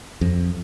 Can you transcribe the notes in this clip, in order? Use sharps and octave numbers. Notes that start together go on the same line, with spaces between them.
F2